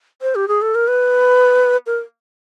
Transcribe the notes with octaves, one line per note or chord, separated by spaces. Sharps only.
C5
G4
G#4
A4
A#4
B4
A#4